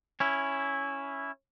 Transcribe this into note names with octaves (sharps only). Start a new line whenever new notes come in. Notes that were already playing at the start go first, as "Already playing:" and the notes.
C#4 E4